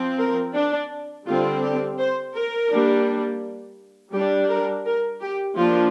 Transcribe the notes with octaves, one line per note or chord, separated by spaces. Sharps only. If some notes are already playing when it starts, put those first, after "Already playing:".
Already playing: F3 C4
A#4
D4
D3 G3 C4 F4
G4
C5
A#4
G3 A#3 D4
G3 D4 G4
A#4
A#4
G4
F3 A#3 D4 F4